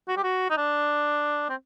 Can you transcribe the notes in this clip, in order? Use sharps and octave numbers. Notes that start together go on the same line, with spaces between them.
F#4
G4
F#4
D#4
D4
C4